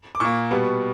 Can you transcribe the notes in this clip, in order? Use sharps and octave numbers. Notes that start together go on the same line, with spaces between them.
D6
A#2 A#3 C#6
B2 G3 B3